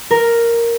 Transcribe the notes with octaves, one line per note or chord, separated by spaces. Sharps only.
A#4